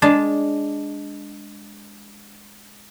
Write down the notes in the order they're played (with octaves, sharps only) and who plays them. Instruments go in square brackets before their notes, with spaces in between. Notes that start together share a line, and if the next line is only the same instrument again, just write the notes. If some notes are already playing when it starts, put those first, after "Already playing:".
[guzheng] G#3 D4 A5 C6